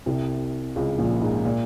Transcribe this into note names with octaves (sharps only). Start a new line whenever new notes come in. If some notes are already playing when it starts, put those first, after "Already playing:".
C2 C3
C#2 C#3
A#1 A#2
G#2
A#2